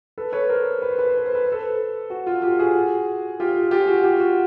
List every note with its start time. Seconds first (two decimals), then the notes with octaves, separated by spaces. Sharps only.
0.18 A4 B4
0.32 B4 C#5
0.49 A#4 C5
0.82 B4
0.91 C5
0.99 B4
1.08 C5
1.17 B4
1.26 C5
1.35 B4
1.44 C5
1.52 A4 B4
2.10 F#4
2.26 F4
2.42 F4 G4
2.59 F#4 G#4
3.40 F4 G4
3.71 F4 G4
3.87 F#4
4.03 F4 G4
4.20 F#4